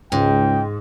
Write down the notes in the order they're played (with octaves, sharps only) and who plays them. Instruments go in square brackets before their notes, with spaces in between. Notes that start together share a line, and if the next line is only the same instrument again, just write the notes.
[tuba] C#2 [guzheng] G#2 [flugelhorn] G5